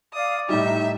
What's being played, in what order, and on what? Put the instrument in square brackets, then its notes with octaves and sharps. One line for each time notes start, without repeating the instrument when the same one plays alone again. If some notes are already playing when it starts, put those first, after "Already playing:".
[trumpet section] D5 [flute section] F5 [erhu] D#6
[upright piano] A2 G3 [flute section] D#4 [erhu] E5